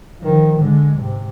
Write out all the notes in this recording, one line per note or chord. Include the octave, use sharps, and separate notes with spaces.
D#3 F3
D3 G#3
G#2 C3